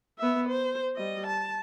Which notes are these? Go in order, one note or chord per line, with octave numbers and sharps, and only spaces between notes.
B3 E5
C5
G3 D#5
A5